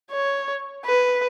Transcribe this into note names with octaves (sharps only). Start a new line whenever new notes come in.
C#5
B4